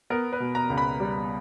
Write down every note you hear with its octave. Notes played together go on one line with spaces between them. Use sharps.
B3 A#4
B4
B2
A#5
C#2
B5
G3